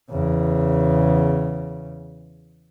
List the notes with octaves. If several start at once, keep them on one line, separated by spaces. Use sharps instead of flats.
E2 C#3